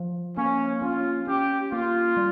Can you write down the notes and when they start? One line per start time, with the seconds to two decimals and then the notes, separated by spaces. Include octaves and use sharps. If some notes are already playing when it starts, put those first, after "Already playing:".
Already playing: F3
0.36 A#3 C#4
0.82 C#4 F4
1.27 C#4 G4
1.72 A#3 F4
2.17 G3